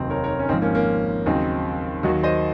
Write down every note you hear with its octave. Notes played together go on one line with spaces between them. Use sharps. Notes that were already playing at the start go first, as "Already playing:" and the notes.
Already playing: F1 D#2 D#3 F#3 C4 D#4
A#4 C#5
A#4 C#5
C#4
G#1 G#2 F3 C4 D#4
A#3 C#4
A#3 C#4
D#2 C#3 F#3 C4 D#4
D#2 D#3 F#3 D#4 F#4
C5 D#5